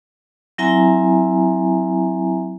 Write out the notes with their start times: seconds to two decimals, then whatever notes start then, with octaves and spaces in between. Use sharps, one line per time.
0.58 F#3 C4 E4 E5 G#5 A#5